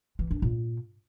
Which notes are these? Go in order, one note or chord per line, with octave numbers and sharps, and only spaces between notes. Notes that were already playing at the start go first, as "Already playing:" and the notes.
E3
D4
A#2